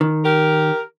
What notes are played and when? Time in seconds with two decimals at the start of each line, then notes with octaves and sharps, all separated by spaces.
0.01 D#3
0.24 G4 A#4